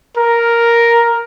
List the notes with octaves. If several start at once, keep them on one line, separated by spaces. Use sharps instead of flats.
A#4